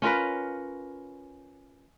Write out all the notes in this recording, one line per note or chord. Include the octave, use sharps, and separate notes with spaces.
C#4 F4 A#4 B4